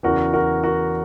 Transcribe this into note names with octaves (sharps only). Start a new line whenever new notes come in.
E2 C#3 E3 F#4 A#4
F#4 A#4
F#4 A#4